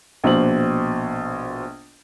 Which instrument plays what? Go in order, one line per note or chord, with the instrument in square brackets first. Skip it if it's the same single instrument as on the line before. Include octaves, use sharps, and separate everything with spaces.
[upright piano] A#1 B2 C5 F#7